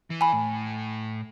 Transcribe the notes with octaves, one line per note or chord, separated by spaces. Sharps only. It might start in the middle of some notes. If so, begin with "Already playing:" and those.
E3
G#5 B5
A2